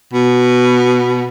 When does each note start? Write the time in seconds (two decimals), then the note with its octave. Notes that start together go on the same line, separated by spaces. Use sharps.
0.14 B2